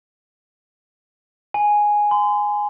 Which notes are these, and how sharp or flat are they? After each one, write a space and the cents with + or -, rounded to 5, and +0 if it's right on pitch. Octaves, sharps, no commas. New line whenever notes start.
G#5 +0
C6 -35